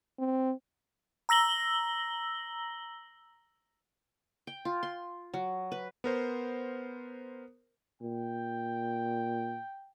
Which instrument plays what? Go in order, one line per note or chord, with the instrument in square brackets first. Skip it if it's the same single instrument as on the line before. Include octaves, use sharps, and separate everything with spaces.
[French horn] C4
[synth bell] A#5 E6 A#6 F#7 G7
[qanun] G5
F4
C6
F#3
B4
[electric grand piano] B3 A#4 C5
[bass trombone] A#2 [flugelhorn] G5